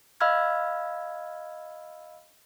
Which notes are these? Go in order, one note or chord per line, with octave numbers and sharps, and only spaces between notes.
D#5 F5 B5 E6 F6 G#6